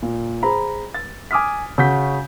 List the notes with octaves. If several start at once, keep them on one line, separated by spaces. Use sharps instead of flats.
A#2
G#4 C5 A#5 B5
A6
G#5 D6 D#6 F6 B6
C#3 F#4 G6 B6